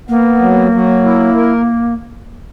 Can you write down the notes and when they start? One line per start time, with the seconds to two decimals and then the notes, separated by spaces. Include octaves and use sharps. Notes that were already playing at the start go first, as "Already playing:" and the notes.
0.09 A#3 B3
0.40 F#3
0.72 F#3
1.04 E4
1.35 A#4